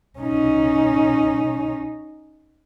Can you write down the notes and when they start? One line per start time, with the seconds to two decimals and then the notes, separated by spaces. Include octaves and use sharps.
0.19 C#4 D#4